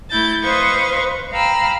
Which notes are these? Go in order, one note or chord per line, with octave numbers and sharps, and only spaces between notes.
A3 E4 G6 A6
B4 C5 D#5 F5 C#6
F5 G5 A#5 B5 E6 F6